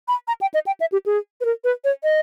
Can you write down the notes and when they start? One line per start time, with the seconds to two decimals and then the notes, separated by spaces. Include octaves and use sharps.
0.08 B5
0.28 A#5
0.41 G5
0.54 D#5
0.66 G5
0.80 E5
0.92 G4
1.06 G#4
1.41 B4
1.45 A#4
1.64 B4
1.85 C#5
2.03 D#5